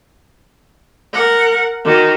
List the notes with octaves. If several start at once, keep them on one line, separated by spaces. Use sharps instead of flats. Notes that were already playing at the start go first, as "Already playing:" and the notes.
A#4 F#5
D#3 F#4